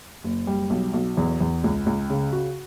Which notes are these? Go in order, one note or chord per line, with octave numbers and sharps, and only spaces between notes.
F#1
G3
B1
B1
E2
E2
C#2
C#2
C#3
F#4